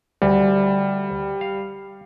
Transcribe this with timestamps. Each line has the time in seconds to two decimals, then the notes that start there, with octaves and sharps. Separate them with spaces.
0.22 D2 G3
1.41 F5